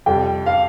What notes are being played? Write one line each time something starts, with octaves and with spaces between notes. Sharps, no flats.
F2 C3 G3 G5
F5